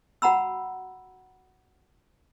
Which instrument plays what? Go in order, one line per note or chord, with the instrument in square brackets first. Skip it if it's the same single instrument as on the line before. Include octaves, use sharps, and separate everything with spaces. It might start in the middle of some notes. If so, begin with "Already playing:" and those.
[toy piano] F#4 F#5 A#5 B5 E6